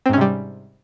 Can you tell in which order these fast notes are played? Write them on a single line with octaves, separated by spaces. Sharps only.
C4 G#2 C#4 C3 G3